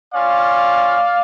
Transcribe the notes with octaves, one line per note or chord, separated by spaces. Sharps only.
C#4 F4 D5 F5